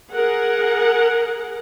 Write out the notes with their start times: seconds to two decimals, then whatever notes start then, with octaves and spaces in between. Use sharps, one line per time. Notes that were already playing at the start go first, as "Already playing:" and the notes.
0.13 G#4 A#4 F#5